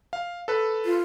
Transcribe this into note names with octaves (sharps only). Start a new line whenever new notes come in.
F5
A4 B4
F4